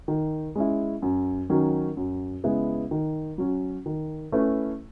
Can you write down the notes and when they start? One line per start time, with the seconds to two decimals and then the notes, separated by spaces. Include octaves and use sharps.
0.08 D#3
0.55 G#3 C#4 E4
1.02 F#2
1.50 D#3 F#3 C#4
1.97 F#2
2.44 C#3 G#3 B3 E4
2.91 D#3
3.38 F#3 C#4 F#4
3.86 D#3
4.32 A3 C#4 E4 B4